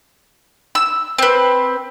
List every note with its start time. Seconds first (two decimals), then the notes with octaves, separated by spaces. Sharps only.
0.75 E6
1.18 C4 B4